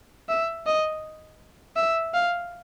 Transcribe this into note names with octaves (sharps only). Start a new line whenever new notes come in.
E5
D#5
E5
F5